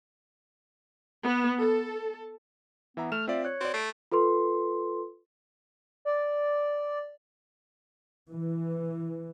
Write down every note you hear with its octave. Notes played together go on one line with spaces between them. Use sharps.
B3
A4
E3 B3 E5 A#5
A3 F6 E7
C4 F4 D5 E5
C#5 F#6
C4 F#4 D5
A3 C7 D7
F4 A4 B4 C6
D5
E3